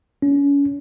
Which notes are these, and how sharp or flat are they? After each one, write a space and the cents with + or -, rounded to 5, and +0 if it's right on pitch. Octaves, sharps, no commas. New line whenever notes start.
C#4 +30